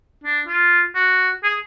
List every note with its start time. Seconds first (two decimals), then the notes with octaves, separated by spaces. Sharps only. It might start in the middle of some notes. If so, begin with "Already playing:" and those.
0.24 D4
0.47 F4
0.95 F#4
1.43 G#4